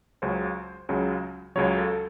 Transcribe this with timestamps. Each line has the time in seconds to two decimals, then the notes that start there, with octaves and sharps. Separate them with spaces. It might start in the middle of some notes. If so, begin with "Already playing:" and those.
0.22 C#2 C#3 F#3 C5
0.89 C#2 C#3 F#3
1.56 C#2 C#3 F#3 C#5
1.78 A4